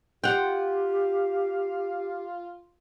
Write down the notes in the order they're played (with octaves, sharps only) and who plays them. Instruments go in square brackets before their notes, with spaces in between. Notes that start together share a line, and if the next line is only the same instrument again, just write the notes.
[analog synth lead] F4 [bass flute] G4 [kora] F#5 G5